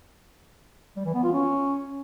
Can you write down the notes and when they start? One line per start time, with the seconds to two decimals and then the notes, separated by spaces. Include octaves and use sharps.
0.96 G3
1.05 E3
1.14 B3
1.23 F4
1.32 C#4